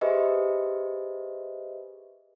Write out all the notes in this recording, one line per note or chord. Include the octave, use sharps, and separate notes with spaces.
G4 G#4 B4 C5 D#5 E5